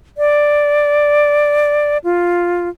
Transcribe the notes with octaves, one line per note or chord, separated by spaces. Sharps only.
D5
F4